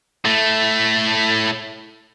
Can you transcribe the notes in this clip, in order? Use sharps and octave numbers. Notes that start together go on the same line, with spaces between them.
A2 A3